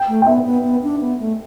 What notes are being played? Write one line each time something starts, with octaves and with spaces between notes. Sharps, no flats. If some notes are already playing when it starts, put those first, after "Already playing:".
Already playing: G5
A3
G5
B3 E5
B3
B3
D4
B3
A3